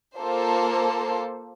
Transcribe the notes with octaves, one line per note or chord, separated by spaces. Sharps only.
A#3 F4 A4 C5